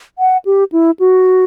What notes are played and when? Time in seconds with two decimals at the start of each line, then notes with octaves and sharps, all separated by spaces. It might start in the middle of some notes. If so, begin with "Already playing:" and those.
0.19 F#5
0.45 G4
0.72 E4
1.00 F#4